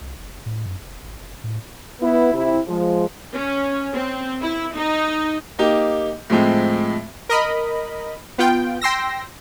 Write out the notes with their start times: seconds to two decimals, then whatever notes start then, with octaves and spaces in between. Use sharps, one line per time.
0.01 C2
0.17 F#1
0.46 A2
0.66 F#2
0.81 F1
1.03 G#1
1.20 F#1
1.44 A2
2.01 B3 E4
2.33 C3 E4
2.67 F3 G#3
3.33 C#4
3.93 C4
4.42 E4
4.75 D#4
5.59 A#3 D#4 G4
6.30 A2 F3 G#3 C4
7.29 A#4 D#5 B5
8.38 B3 F4 G5
8.81 G5 C6 E6 A#6